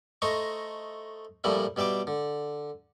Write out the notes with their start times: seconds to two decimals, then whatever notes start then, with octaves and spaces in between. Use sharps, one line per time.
0.22 A3 C5 D#5 A#5 C#6
1.44 A#2 F3 G3 A3 E4
1.76 B2 G3 E5 G5 D6
2.07 D3